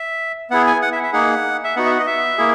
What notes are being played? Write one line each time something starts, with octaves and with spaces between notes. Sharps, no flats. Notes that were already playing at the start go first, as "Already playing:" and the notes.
Already playing: E5
B3 E4 G#4 F#5
G#5
F#5
E5
E5
A#3 D#4 G#4 F#5
E5
B3 D#4 F#4 F#5
E5
F#5
D#5
E5
A#3 E4 G#4